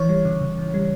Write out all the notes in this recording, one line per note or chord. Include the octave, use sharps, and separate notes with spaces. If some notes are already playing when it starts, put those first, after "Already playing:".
Already playing: E3 C#5
G3
C#3
C#3
E3
G3